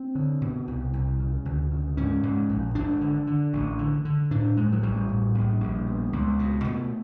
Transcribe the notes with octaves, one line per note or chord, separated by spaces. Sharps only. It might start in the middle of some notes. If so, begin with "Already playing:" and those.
Already playing: C4
D3
B2
C2
C2
C#3
D2
C#3
G#2 C#4
G#2
A#1
G#1 D4
D3
D3
A1
D3
D3
A2 D4
A2 G#3
F#3
A1 G3
A2
A#1
A#1
B2
C#2
B2
B2 A3